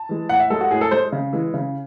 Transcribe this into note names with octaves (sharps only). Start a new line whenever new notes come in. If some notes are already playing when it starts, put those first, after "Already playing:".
Already playing: A5
E3 G#3
A2 F#5
E5
G#3 A4
F#4
A2 G#4
A4
G#3 C5
C#3
E3 G#3
C#3